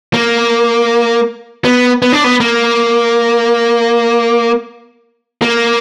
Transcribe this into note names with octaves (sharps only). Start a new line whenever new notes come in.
A#3
B3
B3
D4
B3
A#3
A#3